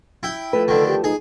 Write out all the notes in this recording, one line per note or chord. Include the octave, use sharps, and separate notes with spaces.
E4 G5
F3 A3 B4
D3 D#3 A4
G4
D#4 G#4